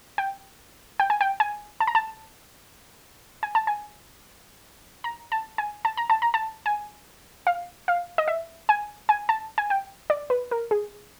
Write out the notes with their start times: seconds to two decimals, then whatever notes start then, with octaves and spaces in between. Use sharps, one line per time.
0.18 G5
1.00 G5
1.10 G#5
1.21 G5
1.40 G#5
1.80 A5
1.87 A#5
1.95 A5
3.43 G#5
3.55 A5
3.67 G#5
5.04 A#5
5.32 A5
5.58 G#5
5.85 A5
5.97 A#5
6.10 A5
6.22 A#5
6.34 A5
6.66 G#5
7.47 F5
7.88 F5
8.18 D#5
8.28 E5
8.69 G#5
9.09 G#5
9.29 A5
9.58 G#5
9.70 G5
10.10 D5
10.30 B4
10.51 A#4
10.71 G#4